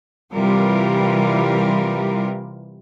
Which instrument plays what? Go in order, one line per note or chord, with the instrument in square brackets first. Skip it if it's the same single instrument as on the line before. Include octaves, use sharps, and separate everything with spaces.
[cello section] C3 E3 G3 F4 G4 A#4